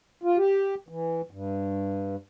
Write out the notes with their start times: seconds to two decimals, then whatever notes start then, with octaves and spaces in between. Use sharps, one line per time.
0.24 F4
0.37 G4
0.89 E3
1.31 G2